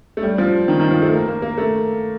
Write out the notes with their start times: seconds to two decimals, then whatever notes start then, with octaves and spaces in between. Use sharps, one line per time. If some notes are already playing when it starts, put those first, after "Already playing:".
0.17 A3
0.23 G3
0.38 F3
0.68 D#3
0.80 D#3
0.91 F3
1.02 A3
1.13 A#3
1.28 A#3
1.42 A#3
1.58 A3